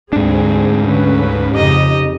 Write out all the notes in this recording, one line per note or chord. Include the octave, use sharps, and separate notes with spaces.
D2 G#2 C4 D4 G#4
D2 D3 C#4 B4
F2 C#3 D#4 G4 D#5